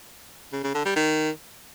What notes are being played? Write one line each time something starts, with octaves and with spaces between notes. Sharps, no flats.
C#3
C#3
D3
G3
D#3